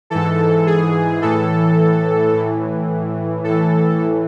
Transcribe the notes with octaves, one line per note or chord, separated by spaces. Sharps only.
G#2 E3 A4
G#4
A2 E3 A4
A2 E3
A2 E3 A4